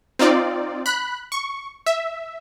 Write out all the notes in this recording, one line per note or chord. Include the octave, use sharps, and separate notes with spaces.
C4 D#4 F4 D5
B5 F#6
C#6
E5